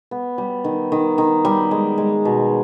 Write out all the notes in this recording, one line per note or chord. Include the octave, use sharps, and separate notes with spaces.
B3
G3
D#3
D#3
D#3
G3
G#3
G#3
B2